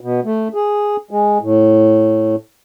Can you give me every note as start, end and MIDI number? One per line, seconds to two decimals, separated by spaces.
0.01 0.20 47
0.25 0.48 57
0.54 0.97 68
1.11 1.38 56
1.41 2.35 45